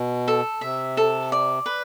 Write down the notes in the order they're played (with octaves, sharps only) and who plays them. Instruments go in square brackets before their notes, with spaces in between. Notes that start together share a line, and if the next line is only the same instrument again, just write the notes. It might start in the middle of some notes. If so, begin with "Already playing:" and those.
Already playing: [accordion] B2
[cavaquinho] A4
[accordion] C3 [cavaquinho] E5
[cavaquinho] A4
D5
B4